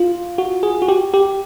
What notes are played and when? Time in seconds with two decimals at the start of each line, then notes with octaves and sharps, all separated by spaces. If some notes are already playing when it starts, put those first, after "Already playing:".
Already playing: F4
0.38 F#4
0.63 G#4
0.82 F#4
0.88 G4
1.14 G4